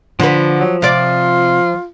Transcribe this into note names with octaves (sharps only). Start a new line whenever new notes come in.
D3 F3 B4
F#3
C3 F4 D5